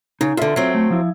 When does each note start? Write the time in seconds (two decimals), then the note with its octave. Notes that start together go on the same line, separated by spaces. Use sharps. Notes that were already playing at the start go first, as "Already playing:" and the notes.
0.21 C#3 D#4
0.37 E2 D3 F4 A4 E5
0.56 F#3 C4
0.75 A3
0.90 F3 E4